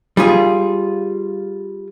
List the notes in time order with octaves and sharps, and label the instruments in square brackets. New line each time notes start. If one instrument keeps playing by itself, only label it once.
[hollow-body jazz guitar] G3 F4 G#4